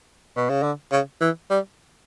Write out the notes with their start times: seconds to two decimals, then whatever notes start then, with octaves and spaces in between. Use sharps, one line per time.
0.36 B2
0.49 C#3
0.63 D3
0.91 C#3
1.21 E3
1.50 G3